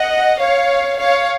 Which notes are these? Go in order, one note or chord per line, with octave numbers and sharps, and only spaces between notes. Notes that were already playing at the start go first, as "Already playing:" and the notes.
Already playing: D#5 F#5
C#5 F5
C#5 F5